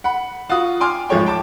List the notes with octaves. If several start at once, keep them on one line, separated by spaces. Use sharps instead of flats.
F#5 B5
F4 F#4 F5 D#6
G5 G#5 C6 D6 F6
D1 G#1 F3 G#3 C#5 G5
G5 A5 D6